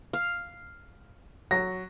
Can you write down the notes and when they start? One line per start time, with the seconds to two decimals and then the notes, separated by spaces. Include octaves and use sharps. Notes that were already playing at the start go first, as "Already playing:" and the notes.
0.13 F5
1.51 F#3 A#6